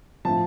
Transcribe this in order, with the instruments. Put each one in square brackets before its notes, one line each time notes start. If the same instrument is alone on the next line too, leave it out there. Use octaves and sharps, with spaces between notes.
[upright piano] A2 F3 A5